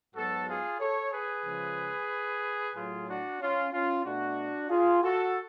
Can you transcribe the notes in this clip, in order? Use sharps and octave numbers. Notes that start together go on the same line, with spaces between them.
G#2 F#3 B3 F#4 A4
F4 G#4
A4 C#5
G#4 B4
C#3 F3 G#3
A2 F#3 A3 F4 G#4
D4 F#4
C#4 F4
C#4 F4
B2 A3 D4 F#4
F4 G#4
F#4 A4